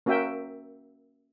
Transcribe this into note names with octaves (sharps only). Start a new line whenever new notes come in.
A#3 C#4 F#4 A#4 E5 G5